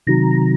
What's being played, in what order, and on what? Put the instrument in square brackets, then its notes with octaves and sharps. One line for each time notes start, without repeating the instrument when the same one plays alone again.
[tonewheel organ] C3 D#3 F#3 A#5